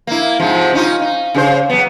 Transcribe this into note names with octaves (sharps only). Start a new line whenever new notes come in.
A#3 E4
G#2 C3 F3
C#4 D#4 F4
D#4
C#3 G4 C5
F#3 B3